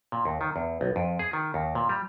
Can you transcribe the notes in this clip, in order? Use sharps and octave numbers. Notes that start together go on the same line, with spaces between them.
A#2
D#2
D#3
E2
B1
F2
G#4
D#3
D#2
A#2
G3